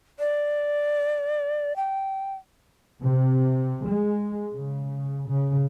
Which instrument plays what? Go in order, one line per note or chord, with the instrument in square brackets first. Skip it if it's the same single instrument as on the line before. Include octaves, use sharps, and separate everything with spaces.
[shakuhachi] D5
G5
[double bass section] C3
G#3
C#3
C#3